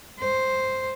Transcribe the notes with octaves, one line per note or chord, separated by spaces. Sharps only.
C5